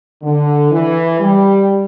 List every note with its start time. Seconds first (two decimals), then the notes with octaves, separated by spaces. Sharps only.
0.22 D3
0.71 E3
1.20 G3